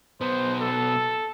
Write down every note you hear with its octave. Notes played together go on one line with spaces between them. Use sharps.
B1 B3 C5
A4